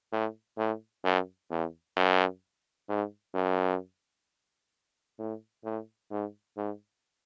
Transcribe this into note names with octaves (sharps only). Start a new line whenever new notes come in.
A2
A2
F#2
E2
F#2
G#2
F#2
A2
A2
G#2
G#2